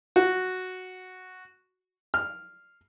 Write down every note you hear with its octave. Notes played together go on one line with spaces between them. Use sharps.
F#4
F6